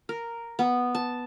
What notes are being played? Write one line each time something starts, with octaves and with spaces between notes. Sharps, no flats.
A#4
B3
A5